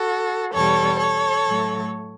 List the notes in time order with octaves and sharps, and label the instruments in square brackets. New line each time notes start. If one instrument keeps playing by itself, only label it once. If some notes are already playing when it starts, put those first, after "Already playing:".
Already playing: [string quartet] F#4 A4
E2 B2 G3 A4 C#5
A4 C#5
A2 F#3 A3